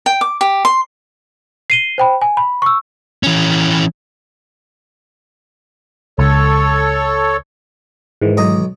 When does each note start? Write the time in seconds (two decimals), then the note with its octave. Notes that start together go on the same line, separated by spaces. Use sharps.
0.06 G5
0.21 D6
0.41 G4
0.65 C6
1.70 C7 D#7 G7
1.98 C5 G5 B5
2.22 G#5
2.37 B5
2.62 C#6 E6
3.23 E3 C#4
6.19 C#2 A4 C#5
8.21 G#2 D#3 E3
8.37 B1 D#5 A#5